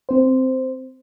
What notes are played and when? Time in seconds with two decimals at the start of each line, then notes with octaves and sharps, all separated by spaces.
0.09 C4 C5